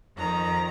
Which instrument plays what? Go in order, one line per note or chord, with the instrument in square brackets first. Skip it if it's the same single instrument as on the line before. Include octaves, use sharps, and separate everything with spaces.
[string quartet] F2 D#3 A#5